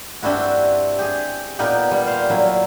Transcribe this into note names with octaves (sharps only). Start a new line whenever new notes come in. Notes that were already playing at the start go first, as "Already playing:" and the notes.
G2 C4 D4 E4 F#4
G4 G#4
A#2 A#3 B3 D#4 G4
G3
C5 F5
A#2 F#3 E4